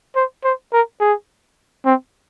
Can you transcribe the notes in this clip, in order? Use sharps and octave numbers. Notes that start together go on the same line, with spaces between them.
C5
C5
A#4
G#4
C4